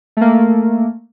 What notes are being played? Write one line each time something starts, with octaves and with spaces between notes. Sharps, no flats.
A3 A#3